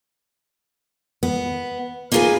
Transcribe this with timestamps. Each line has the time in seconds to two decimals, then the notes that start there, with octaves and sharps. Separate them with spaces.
1.23 B3
2.12 A#3 D#4 F4 G#4 B4 G#5